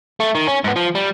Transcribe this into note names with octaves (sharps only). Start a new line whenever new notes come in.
A3
D#3
C#4
G#2 B3
F3
G3